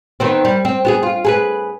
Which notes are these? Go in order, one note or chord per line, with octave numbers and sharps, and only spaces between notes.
D#3 B3 C4
G3
C4
B3 F#4 G#4
F4
G#4 A4 B4